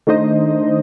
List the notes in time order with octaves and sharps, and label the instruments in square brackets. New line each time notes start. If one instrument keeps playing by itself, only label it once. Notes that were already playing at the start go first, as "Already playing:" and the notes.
[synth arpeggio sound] D#3 A3 D4 D#4 C5 D#5